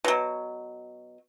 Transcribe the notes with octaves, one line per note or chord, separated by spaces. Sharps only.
B2 F#3